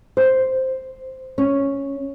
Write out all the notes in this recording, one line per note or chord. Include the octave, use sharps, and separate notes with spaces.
C5
C#4